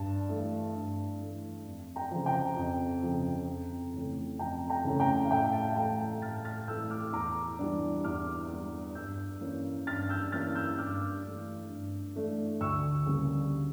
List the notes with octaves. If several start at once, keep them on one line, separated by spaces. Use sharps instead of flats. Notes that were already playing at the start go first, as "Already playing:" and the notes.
Already playing: G2 A5
E3 A3
G2
E3 A3
F2
G5 A#5
C#3 F3
G5 A#5
F2
C#3 F3
F2
C#3 E3 A3 C#4
F2 G5 A#5
G5 A#5
C#3 E3 A3 C#4
G5 A#5
F5
A2 E5 G5
F5 A5
E3 A3 G5 A#5
G5 A#5
A2 F6 A6
F6 A6
E3 A3 E6 G6
D6 F6
E2 A#5 D6
E3 G3 D4
E2 D6 F6
E3 G3 D4
G2 E6 G6
E3 A#3 C#4
G2 F6 A6
E6 G6
E3 A#3 C#4 F6 A6
E6 G6
G2 D6 F6
E3 A3 D4
G2
E3 A3 D4
D2 C#6 E6
C#3 G3 A#3